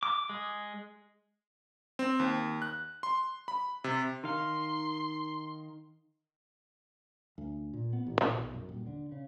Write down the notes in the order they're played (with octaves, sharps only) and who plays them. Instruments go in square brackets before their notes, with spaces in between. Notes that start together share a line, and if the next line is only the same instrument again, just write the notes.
[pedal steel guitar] D6
G#3
[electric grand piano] C4
D#2
F#6
C6
B5
C3
[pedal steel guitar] D#3 F5 [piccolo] C6
[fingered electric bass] D2
A#2
B3
A1
A#2
B1
F#2
D#1
D3
C#3